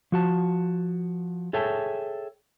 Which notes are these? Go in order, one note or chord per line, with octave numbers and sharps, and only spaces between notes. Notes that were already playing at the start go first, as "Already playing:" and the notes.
F3 F#4 A5
G#4 A4 C#5 E5 G5 A5